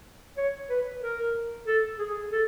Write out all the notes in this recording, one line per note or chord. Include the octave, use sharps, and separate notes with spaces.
C#5
B4
A#4
A4
G#4
A4